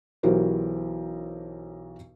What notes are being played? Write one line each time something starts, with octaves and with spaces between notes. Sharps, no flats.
B1 E3 F#3 G4 A#4 C5